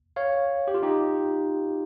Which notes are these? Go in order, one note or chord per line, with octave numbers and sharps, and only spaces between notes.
C#5 F5
G4
F4
D#4 G4